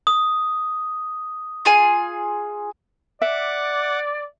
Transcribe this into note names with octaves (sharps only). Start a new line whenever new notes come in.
D#6
F4 G#4 G#5
D5 E5 F#5 D6